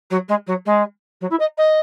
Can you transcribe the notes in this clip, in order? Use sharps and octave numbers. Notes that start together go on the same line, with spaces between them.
F#3
G#3
F#3
G#3
F#3
E4
D#5
D#5